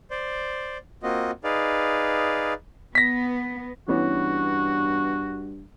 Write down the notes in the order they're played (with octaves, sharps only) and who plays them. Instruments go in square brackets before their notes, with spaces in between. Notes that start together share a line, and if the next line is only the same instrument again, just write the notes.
[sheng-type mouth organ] C5 D5
A#3 C4 F4 F#4 D#5
D#4 G#4 B4 D5 F5
[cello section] B3 [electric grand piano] A#6 B6
[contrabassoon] G2 [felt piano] E3 B3 C#4 [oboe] F#4